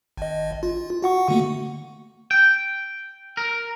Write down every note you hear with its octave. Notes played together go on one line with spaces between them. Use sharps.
G#1 D#5
F4
F#4 F#5 C#6
D3 A3 A#3
G5
A#4